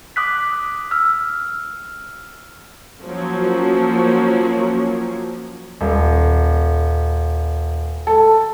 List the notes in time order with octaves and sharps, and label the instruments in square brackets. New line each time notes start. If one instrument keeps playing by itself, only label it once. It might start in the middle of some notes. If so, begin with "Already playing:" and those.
[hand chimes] D6 D#6 F#6 B6
E6 F6
[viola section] F3 F#3 A#3 C#4
[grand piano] D#1
A4